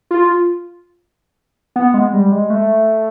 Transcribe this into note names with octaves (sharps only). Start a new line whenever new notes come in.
F4
B3
G#3
G3
G#3
A3